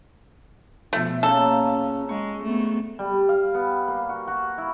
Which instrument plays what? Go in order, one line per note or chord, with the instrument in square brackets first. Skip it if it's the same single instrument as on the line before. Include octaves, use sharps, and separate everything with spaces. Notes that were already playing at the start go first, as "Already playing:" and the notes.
[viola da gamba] B2 F3 [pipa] A3
[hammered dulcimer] A#2 C#3 A#3 [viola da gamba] C#4 [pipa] A4
[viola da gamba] G#3 [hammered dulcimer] C#6
[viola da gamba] A3 B3 C4
[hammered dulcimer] G3
F5
B3
A#3
F#4
F#4
E4